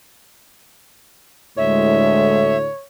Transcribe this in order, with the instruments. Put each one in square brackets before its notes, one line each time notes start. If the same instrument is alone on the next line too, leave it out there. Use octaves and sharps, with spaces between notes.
[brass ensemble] D2 A2 D3 [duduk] G#3 [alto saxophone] C#5 [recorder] E5